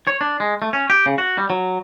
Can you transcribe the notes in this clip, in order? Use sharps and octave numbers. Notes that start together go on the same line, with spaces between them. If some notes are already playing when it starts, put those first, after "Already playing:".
C#5
D4
G#3
A3
C#4
G4
C#3
F#4
G3
F#3